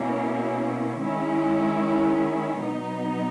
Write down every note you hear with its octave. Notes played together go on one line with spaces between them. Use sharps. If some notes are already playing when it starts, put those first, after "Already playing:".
Already playing: B2 A#3 C#4 E4
D#3 G#3 C#4 E4
B2 F#3 B3 D#4